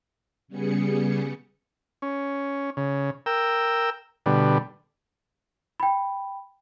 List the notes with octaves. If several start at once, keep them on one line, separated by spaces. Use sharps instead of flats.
C#3 G3 B3 G#4 C#7
C#4
C#3
A#4 G5 E6
B2 D3 G3
G5 B5